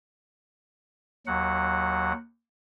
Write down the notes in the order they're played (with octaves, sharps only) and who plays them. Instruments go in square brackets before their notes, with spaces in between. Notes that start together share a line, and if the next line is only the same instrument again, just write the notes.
[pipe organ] D#2 F#3 F#5